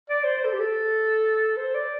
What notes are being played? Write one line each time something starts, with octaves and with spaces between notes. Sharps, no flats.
D5
C5
C5
A4
G4
A4
C5
D5